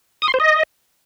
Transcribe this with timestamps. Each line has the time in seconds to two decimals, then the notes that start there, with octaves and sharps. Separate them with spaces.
0.22 D#6
0.28 C6
0.34 C5
0.40 D#5